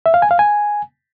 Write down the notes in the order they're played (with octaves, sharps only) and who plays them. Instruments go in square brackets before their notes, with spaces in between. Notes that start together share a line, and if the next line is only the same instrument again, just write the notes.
[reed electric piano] E5
F5
G#5
F5
G#5